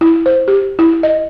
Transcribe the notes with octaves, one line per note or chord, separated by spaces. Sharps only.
E4
C5
G4
E4
D#5